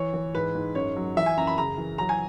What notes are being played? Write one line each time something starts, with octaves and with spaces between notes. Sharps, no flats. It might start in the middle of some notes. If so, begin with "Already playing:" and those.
Already playing: E3 C#5
E3
G#2 B4
G#2
F#2 C#5
F#3
E3 E5
G#5
F#2 A#5
B5
C#3 A#5
E3
F#3 A#5
G#5